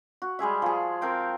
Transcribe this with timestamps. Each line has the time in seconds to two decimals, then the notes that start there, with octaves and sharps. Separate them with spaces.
0.22 F#4
0.39 G3 G#3 G#4 E5
0.62 F3 G#4
1.01 C4 A#4 F5 G5